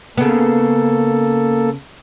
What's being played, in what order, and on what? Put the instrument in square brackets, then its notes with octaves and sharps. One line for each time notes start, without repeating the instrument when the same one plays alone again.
[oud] C#3 B3 [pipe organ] A#3 A4